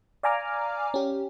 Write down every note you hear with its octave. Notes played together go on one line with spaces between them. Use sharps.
D5 F5 G#5 A#5 D6 F6
C#4 G4